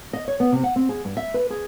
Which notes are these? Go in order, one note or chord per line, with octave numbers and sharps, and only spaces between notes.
D#5
C#5
B3
C3
F#5
C4
G#4
G2
E5
B4
G#4